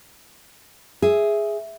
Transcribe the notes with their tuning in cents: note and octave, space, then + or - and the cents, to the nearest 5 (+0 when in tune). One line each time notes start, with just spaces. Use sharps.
G#4 +0 E5 +0